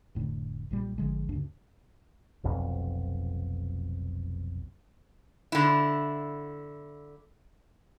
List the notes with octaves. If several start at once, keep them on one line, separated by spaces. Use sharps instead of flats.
F1 A2 D3
B1 A#2 G3
G#1 D3 F3 G#3
D2 G2 C#3 D4
F1 B1 F2
D3 E4